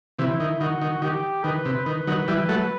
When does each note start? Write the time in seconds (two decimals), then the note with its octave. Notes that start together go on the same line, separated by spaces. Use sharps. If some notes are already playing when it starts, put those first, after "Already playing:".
0.19 C3 E3 E4
0.40 D#3
0.60 D#3 F#4
0.82 D#3
1.02 D#3 G4
1.44 D#3 B4
1.65 C3
1.86 D#3 B4
2.07 D#3 F#3
2.28 E3 G3
2.49 F#3 A3